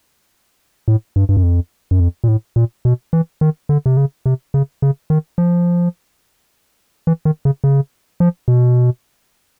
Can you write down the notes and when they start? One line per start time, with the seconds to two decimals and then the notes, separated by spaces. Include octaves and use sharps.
0.88 A2
1.16 G2
1.29 G2
1.37 F#2
1.43 F2
1.91 F#2
2.00 F2
2.24 A#2
2.28 A2
2.56 A#2
2.85 B2
3.13 E3
3.41 D#3
3.69 D3
3.86 C3
3.97 C#3
4.26 C3
4.54 C#3
4.82 C#3
5.10 D#3
5.38 F3
7.07 E3
7.25 D#3
7.45 C#3
7.64 C#3
8.20 F3
8.48 B2